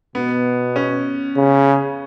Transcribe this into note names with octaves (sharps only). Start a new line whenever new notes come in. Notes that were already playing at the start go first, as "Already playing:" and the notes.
B2 B3
C#4
C#3